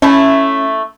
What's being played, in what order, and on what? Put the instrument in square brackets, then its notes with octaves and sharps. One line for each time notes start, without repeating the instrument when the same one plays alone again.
[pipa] A3 E4 A5 [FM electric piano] C#4